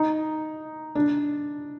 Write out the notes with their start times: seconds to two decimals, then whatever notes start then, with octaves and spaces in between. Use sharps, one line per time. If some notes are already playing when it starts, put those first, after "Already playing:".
Already playing: D#4
0.95 D4